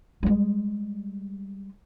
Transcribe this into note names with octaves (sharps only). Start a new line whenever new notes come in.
G3 G#3